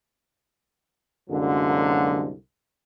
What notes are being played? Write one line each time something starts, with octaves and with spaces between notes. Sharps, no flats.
C2 F#2 D3 F#3 G#3 A#3